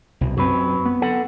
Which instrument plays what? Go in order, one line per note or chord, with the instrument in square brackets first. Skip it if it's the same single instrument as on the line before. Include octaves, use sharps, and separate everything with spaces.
[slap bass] C2 B2
[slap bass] F#2 C4 [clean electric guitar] F#3 B4
[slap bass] B3
[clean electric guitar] A4 F#5